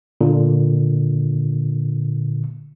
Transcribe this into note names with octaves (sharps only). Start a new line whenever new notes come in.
A#2 D3